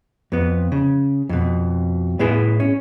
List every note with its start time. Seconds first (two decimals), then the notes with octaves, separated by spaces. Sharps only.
0.32 F2 B3
0.72 C#3
1.29 F2 B2
2.19 A2 B3 E4 G#4
2.60 C#4